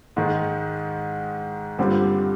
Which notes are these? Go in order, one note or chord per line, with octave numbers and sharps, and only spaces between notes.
G#2 D#3 G#3
G2 D3 G3 C4 F4